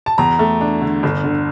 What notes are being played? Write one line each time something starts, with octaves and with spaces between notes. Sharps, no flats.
A5
E2 A#5
A3
D4
D3
G1
D3